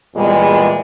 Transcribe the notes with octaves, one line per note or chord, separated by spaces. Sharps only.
E2 A#2 G3 G#3